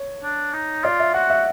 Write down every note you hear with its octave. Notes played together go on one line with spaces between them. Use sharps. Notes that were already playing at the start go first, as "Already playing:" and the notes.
Already playing: C#5
D4
D#4
F4 D5
E5
F#4 F#5
E5